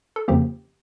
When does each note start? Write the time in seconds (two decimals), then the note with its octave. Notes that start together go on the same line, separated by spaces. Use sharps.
0.16 A4
0.28 F2 C#3 F3 A#3 G4